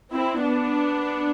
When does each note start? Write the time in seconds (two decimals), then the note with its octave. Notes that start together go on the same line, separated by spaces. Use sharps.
0.13 C4 E4
0.43 B3 D4